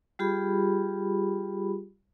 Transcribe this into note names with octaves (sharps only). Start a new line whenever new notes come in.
G3 F4 G4 G#4 B5